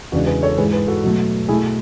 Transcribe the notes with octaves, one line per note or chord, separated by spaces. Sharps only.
E2 C#3 G#3 D4 F#4
G#4 B4
A4 C#5
G#2 E3 G#3 G#4 B4
G#4 B4
F#4 A4
B2 F#3 A3
B2 A3 E4 G#4